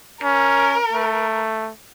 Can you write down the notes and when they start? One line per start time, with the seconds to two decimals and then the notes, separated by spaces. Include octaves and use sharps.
0.23 C#4 A#4
0.92 A3